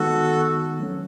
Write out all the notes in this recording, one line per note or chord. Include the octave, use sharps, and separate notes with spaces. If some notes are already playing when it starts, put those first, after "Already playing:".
Already playing: D#3 G#3 B3 D#4 F#4 A4
F#3 A3 C#4